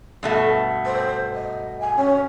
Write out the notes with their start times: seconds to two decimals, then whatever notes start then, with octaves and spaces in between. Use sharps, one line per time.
0.23 G2 B2 A3
0.85 C5
1.34 D#5
1.80 G#5
1.96 C#4